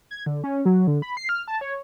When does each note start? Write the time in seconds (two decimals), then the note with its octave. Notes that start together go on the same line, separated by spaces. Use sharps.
0.11 G#6
0.26 D3
0.44 C#4
0.65 F#3
0.87 D3
1.02 B5
1.17 C7
1.29 F6
1.48 A5
1.61 C#5